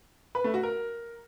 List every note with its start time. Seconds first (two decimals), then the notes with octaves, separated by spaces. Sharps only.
0.35 B4
0.44 A3
0.54 F#4
0.63 A#4